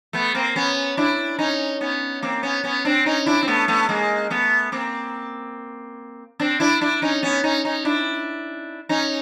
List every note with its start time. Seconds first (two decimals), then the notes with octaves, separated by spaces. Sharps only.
0.13 A3 B3
0.35 A#3 C4
0.56 B3 C#4
0.97 D4 E4
1.39 C#4 D#4
1.81 B3 C#4
2.22 A#3 C4
2.43 B3 C#4
2.64 B3 C#4
2.85 C4 D4
3.06 C#4 D#4
3.26 D4 E4
3.43 C4
3.47 A3 B3
3.68 A3 B3
3.89 G#3 A#3
4.30 A3 B3
4.72 A#3 C4
6.40 C4 D4
6.60 D4 E4
6.81 D4 E4
7.02 C#4 D#4
7.23 B3 C#4
7.44 C#4 D#4
7.65 C#4 D#4
7.85 D4 E4
8.89 C#4 D#4